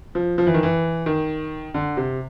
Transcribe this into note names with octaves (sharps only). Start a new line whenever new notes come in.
F3
F3
E3
D#3
E3
D#3
D3
C3